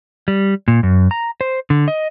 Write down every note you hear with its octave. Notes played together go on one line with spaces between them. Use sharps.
G3
A#2
F#2
A#5
C5
D3
D#5